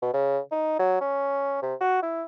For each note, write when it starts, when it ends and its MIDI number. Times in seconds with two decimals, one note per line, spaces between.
0.02 0.11 47
0.13 0.39 49
0.51 0.77 63
0.79 0.96 54
1.01 1.58 61
1.62 1.74 48
1.80 2.03 66
2.03 2.24 64